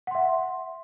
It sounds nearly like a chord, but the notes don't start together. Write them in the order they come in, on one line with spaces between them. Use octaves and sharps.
F#5 C6 E5